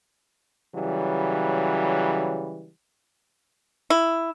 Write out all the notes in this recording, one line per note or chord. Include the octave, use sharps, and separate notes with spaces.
C#3 E3 F#3 G3
E4